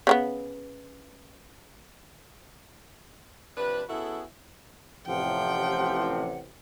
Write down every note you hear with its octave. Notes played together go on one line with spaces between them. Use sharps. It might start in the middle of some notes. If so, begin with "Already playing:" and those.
C#3 F#3 B3
C3 F3 D4 B4
C#3 B3 E4 F#4 G#4 A4
A1 C3 F3 F#5 G5